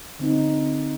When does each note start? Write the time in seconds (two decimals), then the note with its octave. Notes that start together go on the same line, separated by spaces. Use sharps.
0.19 D3 C4 D#4